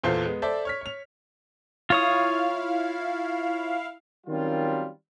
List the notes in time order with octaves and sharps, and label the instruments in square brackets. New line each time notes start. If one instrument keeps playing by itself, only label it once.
[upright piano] E2 A#2 A4 C5 F5 C7
G#3 B3
A4 C5 D5 E5 A5
C#5 F6 B6
C#5 F7
[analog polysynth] E4 F5 [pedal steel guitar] F4 C#5 D#6
[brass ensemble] D#3 F#3 G3 C4 C#4 F4